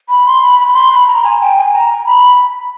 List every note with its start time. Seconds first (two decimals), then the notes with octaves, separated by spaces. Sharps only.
0.09 B5
0.26 C6
0.42 B5
0.59 B5
0.74 C6
0.91 B5
1.07 A#5
1.24 G#5
1.41 G5
1.57 G#5
1.73 A#5
1.90 A#5
2.05 B5